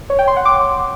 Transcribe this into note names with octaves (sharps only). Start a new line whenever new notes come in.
C#5
G5
C6
F#5
D6